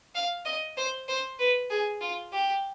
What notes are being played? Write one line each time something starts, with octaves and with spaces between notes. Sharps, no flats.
F5
D#5
C5
C5
B4
G#4
F4
G4